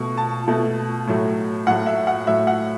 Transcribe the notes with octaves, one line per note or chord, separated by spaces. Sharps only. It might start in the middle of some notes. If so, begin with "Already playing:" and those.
Already playing: B2 A3 C#6
A5
B2 A3
A2 F#3 A3
A2 F#3 A3 F#5
E5
F#5
A2 F#3 A3 E5
F#5